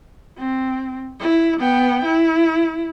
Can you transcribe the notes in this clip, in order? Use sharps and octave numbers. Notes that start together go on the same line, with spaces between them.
C4
E4
B3 G5
E4